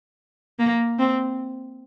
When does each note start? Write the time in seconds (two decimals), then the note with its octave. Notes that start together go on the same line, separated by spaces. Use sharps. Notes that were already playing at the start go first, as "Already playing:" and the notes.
0.59 A#3
0.99 C4